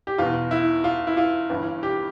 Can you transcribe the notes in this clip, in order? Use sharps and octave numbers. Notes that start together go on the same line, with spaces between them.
G4
E2 B2 F4
E4
F4
E4
F4
G1 G2 E3
G4